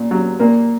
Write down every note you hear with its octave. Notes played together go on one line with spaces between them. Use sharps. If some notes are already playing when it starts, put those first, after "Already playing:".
Already playing: A#2
F#3
A#2 A#3